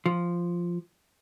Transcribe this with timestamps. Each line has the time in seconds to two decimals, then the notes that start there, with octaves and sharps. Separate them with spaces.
0.06 F3